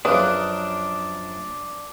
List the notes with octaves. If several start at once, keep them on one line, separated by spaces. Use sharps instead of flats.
F#2 C#3 F3 D4 A#4 B4 D#6 F#6